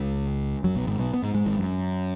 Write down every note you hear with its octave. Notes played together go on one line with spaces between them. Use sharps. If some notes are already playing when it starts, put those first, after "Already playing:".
Already playing: C#2 C#3
F#2 F#3
B1 B2
G#1 G#2
B1 B2
B3
G#2 G#3
G#2 G#3
G#1 G#2
F#2